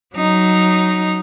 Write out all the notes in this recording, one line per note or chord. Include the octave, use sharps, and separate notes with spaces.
F#3 D#4